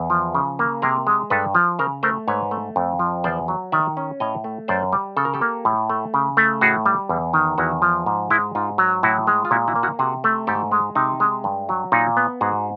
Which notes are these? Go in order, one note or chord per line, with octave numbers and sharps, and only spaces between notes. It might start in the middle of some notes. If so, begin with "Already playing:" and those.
Already playing: E2
F3
C#3
A#3
C3 G#4 A#4
G#3
G2 A4 B4
F3
C#3 A#4 C5
A3 A#4 C5
G#2 B4 C#5
A3
F2
F3
E2 C5 D5
F#3
D#3 D5 E5
C#4
A2 C#5 D#5
A3
F#2 C5 D5
G3
C#3 A4
A#4
G4 A4
A#3
A2
A3
C#3
A3
A2 F#4 G#4
G3
E2
D#3
E2 E4 F#4
F3
G#2
G#3 E4
G#2 D#4 F4
F#3
A2 E4 F#4
G#3
F4
A#2 E4 F#4
E4 F#4
A#3
E4 F#4
C3 F#4 G#4
A3
G#2 G4 A4
G#3
C3 D#4
G#3
G2
F#3
A#2 D#4
B3
G#2 F#4 G#4